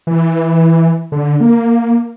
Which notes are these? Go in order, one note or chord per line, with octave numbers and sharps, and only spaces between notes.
E3
D3
A#3